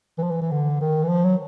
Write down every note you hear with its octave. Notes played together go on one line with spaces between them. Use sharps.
E3
F3
E3
E3
D3
D#3
E3
F3
F#3